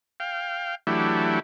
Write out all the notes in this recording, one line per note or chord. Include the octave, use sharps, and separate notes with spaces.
F5 G5
E3 F#3 A3 D4 E4 G4